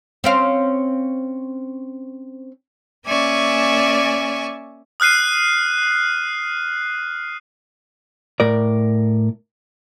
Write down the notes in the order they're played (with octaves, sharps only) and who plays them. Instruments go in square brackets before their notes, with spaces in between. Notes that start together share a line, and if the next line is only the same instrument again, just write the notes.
[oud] C4 C#4 F5
[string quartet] A#3 C#4 D5 E5 G#5 C#6
[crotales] D#6 F6 F#6 C7 D#7
[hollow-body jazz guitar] A2 A#4 D5